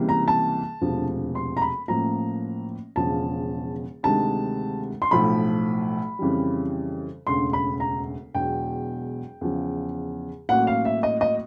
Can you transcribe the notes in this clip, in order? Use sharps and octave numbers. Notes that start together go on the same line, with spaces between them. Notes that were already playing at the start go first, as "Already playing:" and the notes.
Already playing: C#2 C3 E3 G3 A#3
A#5
A5
E1 D2 C3 F3
C6
A#5
B5
A1 A2 F3 A#3 A#5
E1 E2 C#3 F3 A5
D2 C3 D#3 G#3 A5
C6
B1 A2 F3 A3 B5
F2 C#3 E3 G3
E1 D2 C#3 C6
B5
A#5
E1 E2 B2 F#3 G5
E2 C#3 F3
A1 A2 F#3 A#3 F#5
F5
E5
D#5
D#5